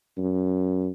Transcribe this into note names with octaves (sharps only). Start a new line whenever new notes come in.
F#2